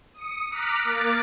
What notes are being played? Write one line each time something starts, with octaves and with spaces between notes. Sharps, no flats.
D#6 C#7
A#5 D6 F6 F#6 B6
A#3 D6 A6